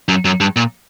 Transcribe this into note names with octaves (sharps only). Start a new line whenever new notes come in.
F#2
F#2
G2
A#2